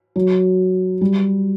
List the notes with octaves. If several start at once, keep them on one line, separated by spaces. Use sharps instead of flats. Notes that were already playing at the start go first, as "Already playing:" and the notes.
F#3
G3